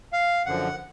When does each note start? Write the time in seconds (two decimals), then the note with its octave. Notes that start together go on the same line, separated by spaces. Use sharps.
0.13 F5
0.46 F#2 D3 F3 F#5